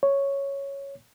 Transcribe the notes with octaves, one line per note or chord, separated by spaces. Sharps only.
C#5